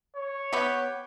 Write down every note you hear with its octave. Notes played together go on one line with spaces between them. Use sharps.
C#5
B3 G4